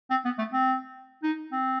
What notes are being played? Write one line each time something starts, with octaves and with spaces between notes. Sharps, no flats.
C4
B3
A3
C4
D#4
C4